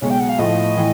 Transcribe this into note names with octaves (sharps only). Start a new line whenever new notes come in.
B1 B2 G#3 C#5
G5
F#5
F5
A2 F3 A3 D#5
A2 E3